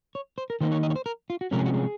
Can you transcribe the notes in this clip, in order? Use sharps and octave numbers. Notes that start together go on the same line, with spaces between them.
C#5
C5
A#4
D#3 A#3 D#4 C5
C#5
D#5
C#5
C5
A#4
F4
F#4
C3 F3 G#3 C#4 A#4
G#4
F#4
G#4